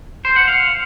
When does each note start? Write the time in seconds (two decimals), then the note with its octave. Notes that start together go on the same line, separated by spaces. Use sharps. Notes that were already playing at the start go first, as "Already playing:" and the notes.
0.25 C5
0.36 F#5
0.48 F5